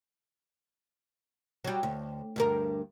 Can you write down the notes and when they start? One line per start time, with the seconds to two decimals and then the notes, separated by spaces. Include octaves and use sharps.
1.64 F#3 G3
1.83 D2
2.36 D2 G2 A#4